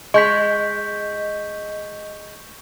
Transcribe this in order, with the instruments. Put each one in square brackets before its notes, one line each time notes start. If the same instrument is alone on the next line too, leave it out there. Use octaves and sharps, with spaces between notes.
[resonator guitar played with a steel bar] G#3 [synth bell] D#5 [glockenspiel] C#6 G6 B6